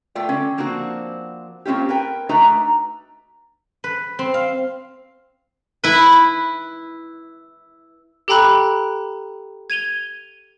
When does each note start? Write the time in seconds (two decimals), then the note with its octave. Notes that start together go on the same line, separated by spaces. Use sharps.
0.15 A3 B3 F4 D5 G5
0.29 D3 C#4
0.57 F3 A#3 C4 D4 F#4
1.65 A#3 C4 C#4 F4 G4
1.89 A#4 B4 G5
2.29 A3 D4 D#4 F#4 B4 A#5
3.84 B4
4.19 C4
4.34 F5
5.84 E4 B4
8.28 G4 A4 G5 A#5 B5 F#6
9.70 G#6 D#7 F7 G7